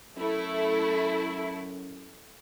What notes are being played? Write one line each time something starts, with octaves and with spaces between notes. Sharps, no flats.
F#2 A3 E4